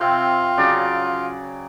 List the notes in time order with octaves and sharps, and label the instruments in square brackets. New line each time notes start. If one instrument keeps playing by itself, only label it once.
[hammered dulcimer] C3 C4 G5 [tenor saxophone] F4
[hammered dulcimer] C#3 F#3 D5